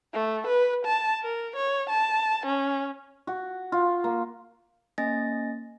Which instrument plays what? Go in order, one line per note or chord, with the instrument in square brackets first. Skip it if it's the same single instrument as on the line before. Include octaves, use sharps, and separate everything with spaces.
[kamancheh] A3
B4
A5
A#4
C#5
A5
C#4
[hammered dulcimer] F#4
F4
A#3
[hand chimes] A#3 C#4 D#5 G#5 A6 A#6